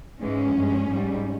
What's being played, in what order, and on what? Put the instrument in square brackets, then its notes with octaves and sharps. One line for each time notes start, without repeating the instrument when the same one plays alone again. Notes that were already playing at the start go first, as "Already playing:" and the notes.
[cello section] G#2 E3 G#3 C#4
G2 F3 G#3
G#2 G3